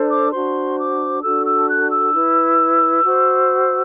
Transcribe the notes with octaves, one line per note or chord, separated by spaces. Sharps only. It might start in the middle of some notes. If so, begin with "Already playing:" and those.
Already playing: D4 A4 C5
D6
D4 F#4 C5 C6
D6
D4 F#4 A4 E6
E6
F#6
E6
E4 B4
F#4 C5